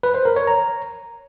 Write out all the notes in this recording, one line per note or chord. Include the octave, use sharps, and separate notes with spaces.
B4
C5
A#4
C#5
A#5